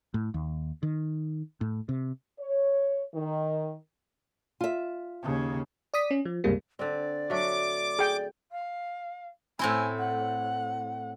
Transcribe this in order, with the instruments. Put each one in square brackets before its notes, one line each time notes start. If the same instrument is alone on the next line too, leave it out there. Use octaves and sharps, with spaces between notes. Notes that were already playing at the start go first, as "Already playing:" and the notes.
[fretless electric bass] A2
D#2
D#3
A2
C3
[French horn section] C#5
D#3
[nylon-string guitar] F4 E5
[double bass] D#2 C#3
[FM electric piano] D5 D#6 B6
C#4
F3
C#2 G2 C3 G3 G#3 A#3
[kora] D3 C4 [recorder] D5
[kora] F#3 A3 D4 [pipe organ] D6
[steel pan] G#4 G5
[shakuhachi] F5
[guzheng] A2 C4 E4 [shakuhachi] G#5
[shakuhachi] F#5